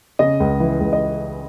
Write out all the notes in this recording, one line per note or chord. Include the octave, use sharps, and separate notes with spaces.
C#3 D#5
C#2
E3
C#2
D#5